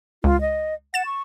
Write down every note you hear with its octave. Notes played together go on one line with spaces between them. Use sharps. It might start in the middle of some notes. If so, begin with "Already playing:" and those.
C#2 F4
D#5
F#5 A6 E7
C#6